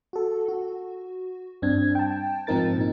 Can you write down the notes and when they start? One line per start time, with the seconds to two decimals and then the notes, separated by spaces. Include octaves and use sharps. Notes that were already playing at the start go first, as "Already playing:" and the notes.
0.13 F#4 A4
0.48 F#4
1.62 G2 C4 D4 G#6
1.95 G5 A5
2.47 G#2 F3 C4 D#4 A#4 A6
2.76 A#2 D#4